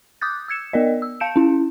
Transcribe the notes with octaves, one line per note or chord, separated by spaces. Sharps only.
D6 D#6 F#6 G6 A6
E6 G#6 C#7 E7
B3 A#4 D5 D#5
E6
F5 A5 G6 C#7 D7 E7
C#4 E4